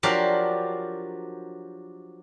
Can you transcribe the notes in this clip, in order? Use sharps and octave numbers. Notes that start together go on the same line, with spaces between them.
F3 F#3 D4 G4 A#4 F5